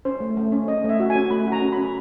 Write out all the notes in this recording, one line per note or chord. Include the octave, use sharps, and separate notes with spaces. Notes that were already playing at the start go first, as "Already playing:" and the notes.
C#4 C5
A3
A3
C#4
C#4 D#5
A3
E5
F#4
G#5
C#4
A3 B5
F#4
A#5
C#4
B5
C#4